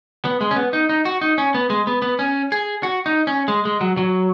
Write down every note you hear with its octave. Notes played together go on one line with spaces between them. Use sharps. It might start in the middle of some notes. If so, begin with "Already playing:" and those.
B3
G#3
C#4
B3
D#4
D#4
F#4
D#4
C#4
B3
G#3
B3
B3
C#4
G#4
F#4
D#4
C#4
G#3
G#3
F#3
F#3